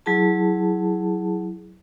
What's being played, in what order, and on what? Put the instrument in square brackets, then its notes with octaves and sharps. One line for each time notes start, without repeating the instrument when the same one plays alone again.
[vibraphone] F#3 E4 G#4 A5